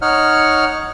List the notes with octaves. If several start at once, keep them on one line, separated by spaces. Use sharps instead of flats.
D#4 C#5 F#5 F6